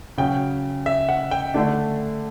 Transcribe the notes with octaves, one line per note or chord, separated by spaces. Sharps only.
C#3 F#3 C#4 G5
E5
F#5
G5
D3 A3 D4